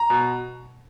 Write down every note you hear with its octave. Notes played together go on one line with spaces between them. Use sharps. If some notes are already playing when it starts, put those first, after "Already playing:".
Already playing: A#5
B2